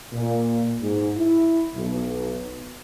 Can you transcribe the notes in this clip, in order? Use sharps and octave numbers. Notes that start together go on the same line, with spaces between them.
A#2
G#2
E4
B1